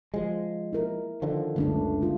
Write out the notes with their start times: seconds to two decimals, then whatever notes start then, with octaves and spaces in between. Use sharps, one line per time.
0.14 F3 G#3
0.73 E4 A#4
1.22 D3 D#3 F3
1.56 F#1 C#2 D3 A3 D4
2.00 D3 G#3 F4